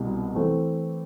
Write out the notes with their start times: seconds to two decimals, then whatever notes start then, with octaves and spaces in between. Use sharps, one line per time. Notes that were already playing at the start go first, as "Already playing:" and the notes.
Already playing: C2 B2 G3
0.35 E3 A3 C4